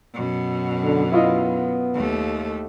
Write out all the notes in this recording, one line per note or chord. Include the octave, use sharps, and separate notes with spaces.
F#2 B2
D3
B3 E4 F4 D#5
D#2 A3